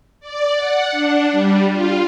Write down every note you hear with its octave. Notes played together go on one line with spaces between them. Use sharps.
D5
F#5
D4
G3
F4